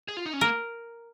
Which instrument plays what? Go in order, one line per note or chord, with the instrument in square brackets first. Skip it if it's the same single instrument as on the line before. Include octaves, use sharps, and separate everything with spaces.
[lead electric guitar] G#4
F4
D#4
C#4
[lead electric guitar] A#3 [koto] A#4